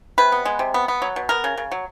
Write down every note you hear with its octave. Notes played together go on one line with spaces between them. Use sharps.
C3 B4
B3
G#3
C3
B3
B3
F#3
B2
B3 A#4
C#3
C#3
F#3